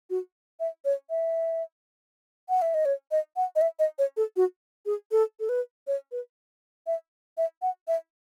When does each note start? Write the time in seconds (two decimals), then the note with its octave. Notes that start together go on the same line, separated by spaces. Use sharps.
0.10 F#4
0.60 E5
0.85 C#5
1.10 E5
2.49 F#5
2.62 E5
2.74 D#5
2.85 C#5
3.11 D#5
3.36 F#5
3.56 D#5
3.61 E5
3.79 D#5
3.99 C#5
4.17 A4
4.36 F#4
4.86 G#4
5.12 A4
5.40 A4
5.49 B4
5.87 C#5
6.12 B4
6.87 E5
7.37 E5
7.62 F#5
7.88 E5